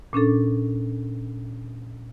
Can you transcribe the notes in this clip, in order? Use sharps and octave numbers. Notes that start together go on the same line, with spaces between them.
A#2 C#4 D4 A4